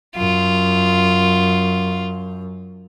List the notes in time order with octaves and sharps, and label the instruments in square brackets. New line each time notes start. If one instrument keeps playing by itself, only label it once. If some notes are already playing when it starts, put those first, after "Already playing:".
[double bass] F#2 [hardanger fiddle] F4